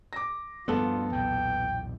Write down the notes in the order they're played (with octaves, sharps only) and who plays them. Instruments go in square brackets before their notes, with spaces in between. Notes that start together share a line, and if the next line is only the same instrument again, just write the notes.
[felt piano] D6 A#6
[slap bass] D2 G2 F3 [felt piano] B3 A4 [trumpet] F4
[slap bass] B1 E2 A#2 [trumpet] G5